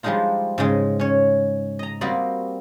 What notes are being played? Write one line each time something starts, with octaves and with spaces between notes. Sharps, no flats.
F3 G3 G#3 D4 D#4 F4
G#2 C#3 G#3
C#4 C#5
D#5 A#5
G3 A#3 C4 F#4 D5 D#5